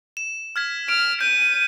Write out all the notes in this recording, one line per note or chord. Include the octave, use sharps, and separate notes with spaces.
E7
F6 G#6 B6
F6 D7
G6 D#7